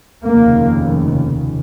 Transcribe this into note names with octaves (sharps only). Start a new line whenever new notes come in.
F1 D#2 C#3 A#3